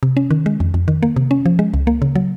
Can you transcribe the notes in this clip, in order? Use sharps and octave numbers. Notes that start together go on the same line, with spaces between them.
C3
C#4
D#3
G#3
F2
F2
D#3
A#3
C3
C#4
F3
G#3
C#2
A#3
C#3
F#3